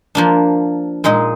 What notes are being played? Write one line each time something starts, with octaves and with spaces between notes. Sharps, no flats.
F3 A#3 D4
A#2 G#3 D#4 G#4